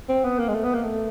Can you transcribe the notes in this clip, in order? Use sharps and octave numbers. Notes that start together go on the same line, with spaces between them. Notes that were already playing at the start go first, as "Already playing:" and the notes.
C4
B3
A#3
G#3
A3
B3
A#3
A3